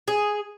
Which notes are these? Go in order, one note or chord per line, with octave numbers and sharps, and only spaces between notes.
G#4